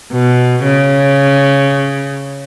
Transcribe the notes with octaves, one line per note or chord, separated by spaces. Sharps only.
B2
C#3